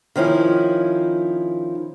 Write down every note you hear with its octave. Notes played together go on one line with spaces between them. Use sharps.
D#3 F3 C#4 E4